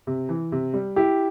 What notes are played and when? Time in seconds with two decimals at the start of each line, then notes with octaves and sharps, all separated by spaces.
0.07 C3
0.29 E3
0.52 C3
0.73 G3
0.96 E4 G4